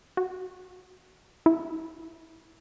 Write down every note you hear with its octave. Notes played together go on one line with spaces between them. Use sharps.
F#4
E4